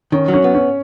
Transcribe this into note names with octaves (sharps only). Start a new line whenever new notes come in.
D#3 C#4
F#3
C#4
B3
C#4